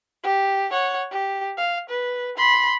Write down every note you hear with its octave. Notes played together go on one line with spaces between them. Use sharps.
G4
C#5 F#5
G4
F5
B4
B5 C6